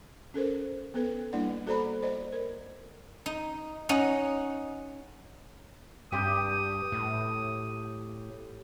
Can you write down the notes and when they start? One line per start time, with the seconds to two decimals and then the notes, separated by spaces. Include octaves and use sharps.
0.34 C#4 A4 A#4 C5
0.94 B3 A4 B4
1.33 G3 A#3 D4 E4 D5 F#5
1.66 F#4 A4 C5 D5 A#5 B5
2.02 C5 D5 D#5
2.33 A#4
3.26 D#4
3.89 C#4 D#4 D#5 F#5 A#5
6.12 G2 G4 G5 C6 D#6
6.92 A2